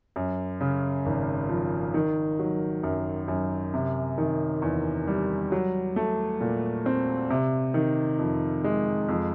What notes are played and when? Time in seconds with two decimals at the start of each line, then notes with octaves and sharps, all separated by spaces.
0.16 F#2
0.61 C#3
1.06 G#1
1.49 F3
1.94 D#3
2.39 F#3
2.83 F#2
3.28 F#2
3.74 C3
4.18 D#3
4.62 E2
5.07 G3
5.52 F#3
5.96 A3
6.41 A#2
6.86 C4
7.30 C3
7.74 D#3
8.19 F2
8.64 G#3
9.09 F2